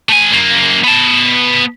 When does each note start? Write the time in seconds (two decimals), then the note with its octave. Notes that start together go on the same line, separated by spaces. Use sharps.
0.09 A3 G#5
0.32 F#2 A#3
0.84 B3 A5